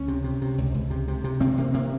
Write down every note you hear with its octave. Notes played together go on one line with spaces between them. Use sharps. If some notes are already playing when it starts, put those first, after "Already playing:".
Already playing: C#2 C#4
C3
C3
C3
C#2
C#2
C3
C3
C3
C3 C4
C3 A#3
C3 A#3